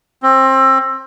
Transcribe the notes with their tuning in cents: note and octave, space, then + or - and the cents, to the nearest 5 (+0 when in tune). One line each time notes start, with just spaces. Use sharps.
C4 +25